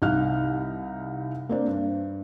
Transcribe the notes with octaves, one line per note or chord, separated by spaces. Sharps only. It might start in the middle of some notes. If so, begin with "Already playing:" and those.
C2 D#4 F5 F6 F#6
A#3 C4 D4
G2